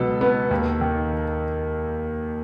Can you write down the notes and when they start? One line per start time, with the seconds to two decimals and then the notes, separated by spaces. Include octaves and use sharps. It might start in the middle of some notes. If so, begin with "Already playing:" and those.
Already playing: C#2 B2 F#3 B3 A4
0.21 B3
0.51 D#2
0.81 D#3